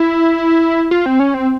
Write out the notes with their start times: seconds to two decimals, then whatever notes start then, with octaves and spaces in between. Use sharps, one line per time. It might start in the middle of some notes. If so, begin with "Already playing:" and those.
Already playing: E4
0.91 F4
1.06 C4
1.20 C#4
1.34 C4